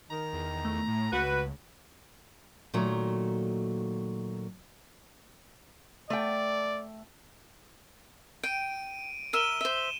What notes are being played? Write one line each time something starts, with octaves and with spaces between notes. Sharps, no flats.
D#3 A#5
E2
A3
A2
C#2 F#4 B4
A#2 D#3 F#3 A3 A#5
A3 D5 G5
G5 D7 D#7
A#4 E5 D#7 E7 G7
C5 E5